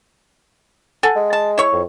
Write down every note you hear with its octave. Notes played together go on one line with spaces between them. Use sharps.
A4 F#5 G#5
G#3
A5
E4 C#5 C#6
F2